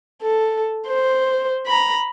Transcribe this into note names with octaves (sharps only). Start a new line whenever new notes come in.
A4
C5
A#5 B5